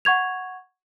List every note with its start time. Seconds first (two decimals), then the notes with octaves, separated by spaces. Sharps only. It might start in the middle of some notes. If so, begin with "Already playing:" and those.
0.05 F#5 C#6 G#6 F7